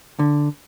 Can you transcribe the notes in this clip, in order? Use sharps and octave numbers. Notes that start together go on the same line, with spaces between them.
D3